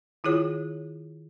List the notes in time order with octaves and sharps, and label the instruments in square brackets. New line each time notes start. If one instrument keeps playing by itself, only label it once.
[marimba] D#3 E4 F4 G#4 C#5 D#6